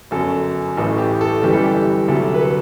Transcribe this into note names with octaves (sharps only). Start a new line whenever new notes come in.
G1 F#2 F#3 A4
A1 A2 E3 A4
G4
A4
G1 F#2 E3 G3 G4
A4
G4
D2 C3 F#3 A4
B4
A4